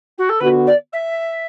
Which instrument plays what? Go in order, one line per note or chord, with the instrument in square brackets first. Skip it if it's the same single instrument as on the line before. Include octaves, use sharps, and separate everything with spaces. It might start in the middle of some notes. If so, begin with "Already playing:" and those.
[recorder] F#4
A4
[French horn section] D3 B3 F#4 [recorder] B4
[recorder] D5
E5